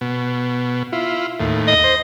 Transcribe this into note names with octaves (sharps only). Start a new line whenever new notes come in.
B2
E4 F4
D#2 A2
D#5
C5